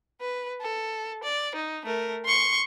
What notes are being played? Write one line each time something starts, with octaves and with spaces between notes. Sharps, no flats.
B4
A4
D5
D#4
A3 A#4
C6 C#6